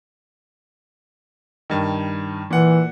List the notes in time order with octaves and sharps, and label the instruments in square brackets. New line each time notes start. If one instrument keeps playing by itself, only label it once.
[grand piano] G2 D#3
[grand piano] A#2 F#5 [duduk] E3